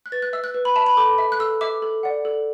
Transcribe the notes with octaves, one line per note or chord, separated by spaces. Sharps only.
F#6
B4 A6
F#6
E5 E6
F#6
B4
B5
E5 A5
B5
A4 D6
E5
F#6
A4 E6
E5 D6
A4
D5 F#5
A4